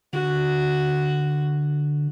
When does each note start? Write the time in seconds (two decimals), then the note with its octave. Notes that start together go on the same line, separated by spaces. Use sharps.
0.13 D3 F#4